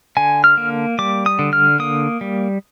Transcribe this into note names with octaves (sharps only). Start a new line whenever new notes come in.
D3 G#5
F6
A#3
G3 D6
D#6
D3
F6
A#3 D#6
G3